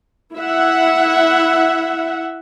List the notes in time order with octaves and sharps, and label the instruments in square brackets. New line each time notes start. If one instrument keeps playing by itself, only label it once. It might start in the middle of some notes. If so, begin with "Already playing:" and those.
[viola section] E4 E5 F#5